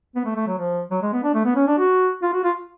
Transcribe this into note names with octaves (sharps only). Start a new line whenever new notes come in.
B3
A3
A3
F#3
F3
F#3
G#3
B3
D4
A3
B3
C#4
D4
F#4
F4
F#4
F4